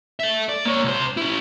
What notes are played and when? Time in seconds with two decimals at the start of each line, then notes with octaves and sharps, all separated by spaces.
0.20 A4 E5
0.49 D5
0.65 A#3 C#5
0.84 C2 C5
1.17 C#4 E4